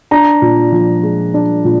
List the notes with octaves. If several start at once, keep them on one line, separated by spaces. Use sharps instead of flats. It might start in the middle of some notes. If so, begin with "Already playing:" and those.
D4 A#5
A#2
F3
G#3
D4
A#2